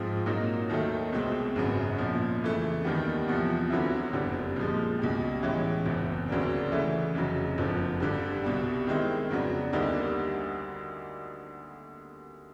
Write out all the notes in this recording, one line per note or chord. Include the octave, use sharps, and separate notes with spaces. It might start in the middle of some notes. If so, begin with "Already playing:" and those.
Already playing: G#2 F3 G#3 C4 F4
A#2 F#3 A#3 D#4 F#4
D#2 D#3 F#3 A3
C2 B2 G#3 C4
G#1 F#2 C#3 F#3 B3
A#1 A#2 F3
F2 C#3 E3 A3
D#2 D#3 G3 B3
E2 C3 F3
D2 D3 F#3 B3 E4
F#1 F2 D3 G3
A#2 F3 G#3
C#2 B2 G3
A2 E3 G#3 C#4
F#1 E2 C3
D2 C#3 F#3 A#3 D4
C#3 E3 A3
F1 F2 C#3 F#3
F#1 F2 D3 F3
G2 D3 G3
C2 B2 G3
D#3 G#3 C4 E4
F2 C#3 F#3 B3 D4
D2 D3 G3 A#3 D#4